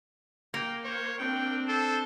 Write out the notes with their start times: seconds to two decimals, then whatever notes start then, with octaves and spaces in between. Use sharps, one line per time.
0.54 A#3 G5
0.84 C5 C#5
1.18 C4 D4 G5
1.68 A4 C5